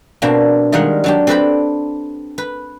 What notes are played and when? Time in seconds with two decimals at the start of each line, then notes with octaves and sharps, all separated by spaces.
0.22 B2 A#3 C4 D4
0.72 D#3 G3 G#3 A#4 F5 F#5
1.04 F#3 D4 G4
1.27 C4 A4 B4 D5 G5 B5
2.38 B4